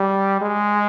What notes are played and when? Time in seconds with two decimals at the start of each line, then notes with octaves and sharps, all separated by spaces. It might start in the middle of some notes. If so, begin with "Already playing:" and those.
Already playing: G3
0.41 G#3